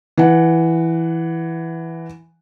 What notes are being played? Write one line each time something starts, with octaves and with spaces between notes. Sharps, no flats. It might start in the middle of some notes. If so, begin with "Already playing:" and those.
E3 F#5